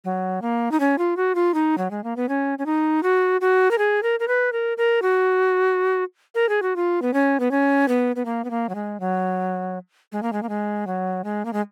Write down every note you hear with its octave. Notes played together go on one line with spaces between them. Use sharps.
F#3
A#3
D#4
C#4
F4
F#4
F4
D#4
F#3
G#3
A#3
B3
C#4
C#4
D#4
F#4
F#4
A#4
G#4
A#4
A#4
B4
A#4
A#4
F#4
A#4
G#4
F#4
F4
B3
C#4
B3
C#4
B3
B3
A#3
B3
A#3
F#3
G#3
F#3
G#3
A#3
G#3
A#3
G#3
F#3
G#3
A#3
G#3